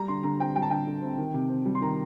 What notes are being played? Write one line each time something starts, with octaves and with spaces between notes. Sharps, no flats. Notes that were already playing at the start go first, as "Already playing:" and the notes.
Already playing: G3 A#5
D3 C6
D3 A#5
C4 G5
G3 G5
A5
D3 G5
D3
C4
D#3
C3
C4
G3
C6
D#3 A#5